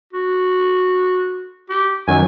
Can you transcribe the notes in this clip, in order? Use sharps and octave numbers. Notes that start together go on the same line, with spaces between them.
F#4
G4
F#2 D#3 F#3 G#5